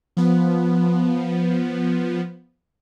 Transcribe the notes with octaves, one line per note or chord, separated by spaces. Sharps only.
F3 B3